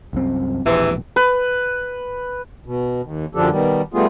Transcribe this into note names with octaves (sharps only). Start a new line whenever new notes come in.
C2 F#2 C4
E1 A#1 G#2 C3 E3
B4
B2
D#2
F#2 D3 F3 D4 G4 A4
B2 D#3 G3
G3 A3 B3 F4 G#4